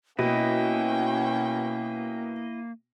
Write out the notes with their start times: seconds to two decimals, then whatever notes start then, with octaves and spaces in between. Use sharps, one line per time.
0.19 B2 A#3 C#4 E4 D#5 G5